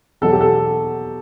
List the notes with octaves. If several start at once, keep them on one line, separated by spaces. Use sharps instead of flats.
E2 B2 F#3 A4
G4
A4